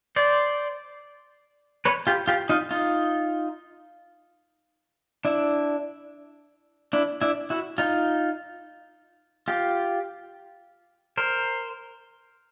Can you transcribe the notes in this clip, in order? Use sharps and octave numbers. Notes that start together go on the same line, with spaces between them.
C5 D5
B4 C#5
F4 G4
F4 G4
D#4 F4
D#4 F4
D4 E4
D4 E4
D4 E4
E4 F#4
D#4 F4
F4 G4
A#4 C5